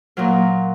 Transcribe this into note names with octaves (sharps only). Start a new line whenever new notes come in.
A#2 F#3 F4